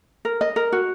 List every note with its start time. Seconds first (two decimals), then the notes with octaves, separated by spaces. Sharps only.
0.25 A#4
0.41 D#5
0.56 A#4
0.72 F#4